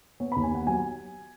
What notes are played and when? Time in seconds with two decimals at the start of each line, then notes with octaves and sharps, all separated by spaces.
0.20 B3 C#5
0.32 D#2 B5
0.43 G#5
0.51 B3 F#5
0.67 F#3 G#5